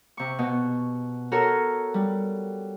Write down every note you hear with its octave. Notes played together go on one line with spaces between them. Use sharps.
C3 C#6
B2
F#4 A4 A#4 C#5
G3